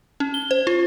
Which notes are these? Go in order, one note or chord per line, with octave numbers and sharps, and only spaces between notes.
C#4
G7
C5
F4